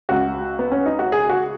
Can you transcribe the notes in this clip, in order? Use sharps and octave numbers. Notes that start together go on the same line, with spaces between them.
C#2 C#3 F#4
B3
C#4
D#4
F#4
G#4
F#4